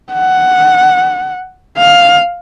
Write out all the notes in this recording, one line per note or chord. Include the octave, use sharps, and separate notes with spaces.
F#5
F5